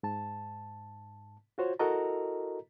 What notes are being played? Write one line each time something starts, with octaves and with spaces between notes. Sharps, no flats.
G#2 A5
F4 F#4 C5 C#5
E4 F#4 A4 A#4 D#5 A#5